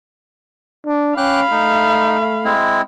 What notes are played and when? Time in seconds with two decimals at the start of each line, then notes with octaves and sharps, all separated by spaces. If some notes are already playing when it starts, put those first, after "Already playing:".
0.86 D4
1.17 C#4 F5 G5 B5 D6 F#6
1.51 A3 D#4
2.45 G#3 C4 E4